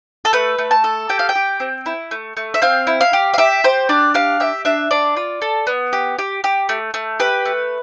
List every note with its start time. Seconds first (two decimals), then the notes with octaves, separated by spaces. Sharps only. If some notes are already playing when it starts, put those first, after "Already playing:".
0.25 A4
0.33 A3 B4
0.59 A3
0.71 A5
0.84 A4
1.09 G4 G5
1.19 F5
1.29 G5
1.35 G4
1.60 C4
1.86 E4
2.11 A3
2.37 A3
2.54 E5
2.62 C4 F5
2.87 E4
3.01 F5
3.13 G4
3.34 F5
3.38 G4 E5
3.64 G4 C5
3.89 D4 D5
4.14 G4 F5
4.40 G4 E5
4.65 D4 E5
4.91 D4 D5
5.17 F4
5.42 A4
5.67 B3
5.93 G4
6.19 G4
6.44 G4
6.69 A3
6.94 A3
7.20 G4 B4
7.45 A3